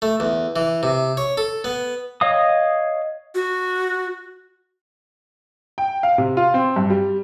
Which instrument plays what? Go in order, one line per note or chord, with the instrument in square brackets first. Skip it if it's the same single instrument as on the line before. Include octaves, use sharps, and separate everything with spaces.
[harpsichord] A3
E2
E3
C3
C#5
A4
B3
[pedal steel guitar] C#5 D#5 F5 D#6
[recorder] F#4
[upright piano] G5
F5
C3
F4
C4
G2
G3